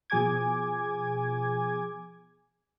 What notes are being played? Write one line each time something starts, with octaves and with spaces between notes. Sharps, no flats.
B2 F3 G#4 G#5 D6 G#6